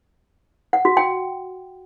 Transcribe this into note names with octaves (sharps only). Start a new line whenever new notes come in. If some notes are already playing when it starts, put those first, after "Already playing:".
F#5
F#4
G5